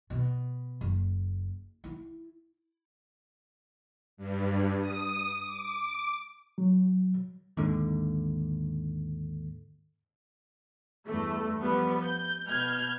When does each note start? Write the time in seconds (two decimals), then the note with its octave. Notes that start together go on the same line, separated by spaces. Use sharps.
0.10 B2
0.81 F#1
1.84 E4
4.17 G2
4.80 D#6
5.44 D6
6.58 F#3
7.57 D#2 G#2 D3
11.06 E2 G2 A3
11.61 F3 G3 B3
12.04 G6
12.47 B2 F6 G6 G#6